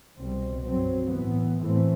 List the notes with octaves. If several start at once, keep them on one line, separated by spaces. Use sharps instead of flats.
C2 B2 G3 C4
G2 F#3 C4
A2 E3 B3
A2 E3 A3 C4